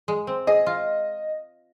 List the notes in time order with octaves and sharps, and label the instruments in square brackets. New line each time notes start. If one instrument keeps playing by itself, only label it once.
[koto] G#3
C4
[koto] G#4 [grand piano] D#5
[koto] F4